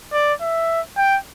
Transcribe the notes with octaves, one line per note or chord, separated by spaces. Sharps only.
D5
E5
G5